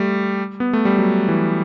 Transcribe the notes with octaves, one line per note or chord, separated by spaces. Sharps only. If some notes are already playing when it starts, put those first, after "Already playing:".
Already playing: G3 A3
B3
A3
G3
F#3
E3